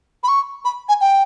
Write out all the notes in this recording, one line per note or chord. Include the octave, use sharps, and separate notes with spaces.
B5
C#6
B5
G#5
G5